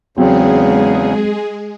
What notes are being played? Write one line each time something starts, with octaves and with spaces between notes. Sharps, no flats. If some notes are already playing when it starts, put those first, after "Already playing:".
E2 C#3 F#3 G#3 C4 G#4